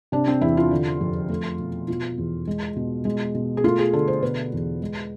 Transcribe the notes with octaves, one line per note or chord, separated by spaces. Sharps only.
C3 D4
C4
E2 E4
F4
D3
F2
A3
B2
B2 F4
E2
G#3
B2
G#3
B2
G#4
A3 F4
G#4
D3 A4
C5
B2 B4
E2
G#3